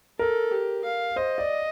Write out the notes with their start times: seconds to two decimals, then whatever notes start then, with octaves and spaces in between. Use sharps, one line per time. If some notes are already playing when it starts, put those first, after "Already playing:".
0.19 A4 A#4
0.51 G4
0.84 F5
1.16 C5 D#5
1.38 D5